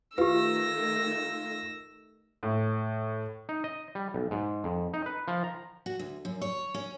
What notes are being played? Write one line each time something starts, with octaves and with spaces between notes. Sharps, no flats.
D#3 A3 F4 G4 B4 E6 A#6
A2
D#4
D#5
G3
B1
G#2
F2
D#4
B4
F3
A#5
F#4
D2
F#2
C#5
C#4